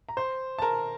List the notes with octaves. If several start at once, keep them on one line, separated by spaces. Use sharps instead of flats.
A#5
C5 C6
A5
A#4 A#5